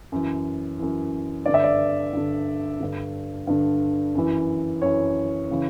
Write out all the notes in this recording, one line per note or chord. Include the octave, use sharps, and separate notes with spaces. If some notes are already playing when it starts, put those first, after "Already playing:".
F#2 E3
F#2 E3
G2 D3 D5
E5
D5
G2 D3
G2 D3
G2 D3
F#2 E3
F#2 E3 C#5
C#3 E3